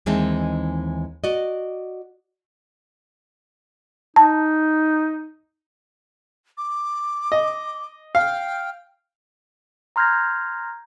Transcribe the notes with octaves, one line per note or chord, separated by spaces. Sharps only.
D#2 E3 G#3 C4 D#4 A5
F#4 D5 D#5
D#4 A5
D6
D#5
F5 G5
A#5 C6 F6 G6 G#6 A#6